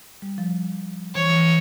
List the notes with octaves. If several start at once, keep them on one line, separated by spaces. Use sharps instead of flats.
G3
F3
E3 C#5
E3